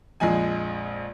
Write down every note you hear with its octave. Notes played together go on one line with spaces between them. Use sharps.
A#1 F2 G#3 G#5